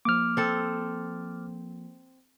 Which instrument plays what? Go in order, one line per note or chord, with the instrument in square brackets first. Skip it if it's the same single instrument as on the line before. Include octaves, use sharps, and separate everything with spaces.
[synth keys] F3 A#3 [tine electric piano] D6 F6
[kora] C4 A4